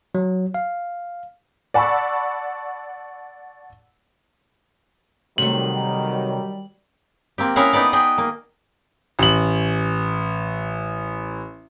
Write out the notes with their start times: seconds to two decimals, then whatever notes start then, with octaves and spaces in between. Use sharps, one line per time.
0.15 F#3
0.54 F5
1.74 D5 F#5 A5 B5 C#6 E6
5.38 C3 D#3 F#3 G3 A3 F#7
7.38 A#3 C4 G4
7.56 C#4 E4 G#4 A#4 F5 F#5
7.72 B3 D#4 B4 D5 G5
7.93 G#4 D#5 G5
8.18 A#3
9.19 A1 F#7